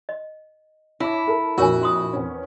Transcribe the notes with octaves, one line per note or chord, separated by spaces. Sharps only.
D#5
E4 C#5 E5 A5 D6
A4 A#4
A#1 F2 F#4 A#4 C#5 G#5
C6 D#6
E2 C4 C#4